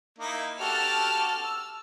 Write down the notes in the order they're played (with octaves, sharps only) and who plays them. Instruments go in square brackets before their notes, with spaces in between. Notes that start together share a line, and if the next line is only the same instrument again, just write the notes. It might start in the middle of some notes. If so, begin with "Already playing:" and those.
[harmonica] A#3 D#4 E4
[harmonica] F#4 G4 A4 [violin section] A5 F6
[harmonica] E6